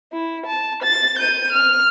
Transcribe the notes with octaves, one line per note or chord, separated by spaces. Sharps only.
E4
A5
A6
G6 D#7
F6